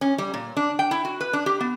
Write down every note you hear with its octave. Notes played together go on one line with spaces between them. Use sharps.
C#4
G3
A#2
D4
G5
E4
F#4
B4
D4
G4
B3